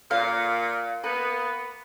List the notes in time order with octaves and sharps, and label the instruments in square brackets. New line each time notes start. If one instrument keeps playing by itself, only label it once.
[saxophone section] A#2 [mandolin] F5
[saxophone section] A#3 B3 [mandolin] B4